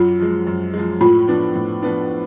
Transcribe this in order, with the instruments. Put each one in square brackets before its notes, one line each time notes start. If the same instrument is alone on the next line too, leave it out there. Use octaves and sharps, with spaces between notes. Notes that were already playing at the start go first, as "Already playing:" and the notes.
Already playing: [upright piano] F#2 [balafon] F4
[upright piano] F3 G#3
F#2
F3 G#3
[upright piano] A2 [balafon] F4
[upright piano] F3 B3 D4
A2
F3 B3 D4